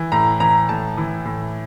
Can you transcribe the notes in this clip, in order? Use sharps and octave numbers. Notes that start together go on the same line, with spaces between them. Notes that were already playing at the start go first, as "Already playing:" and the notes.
Already playing: E3
A2 A#5
E3 A#5
A2 A5
E3
A2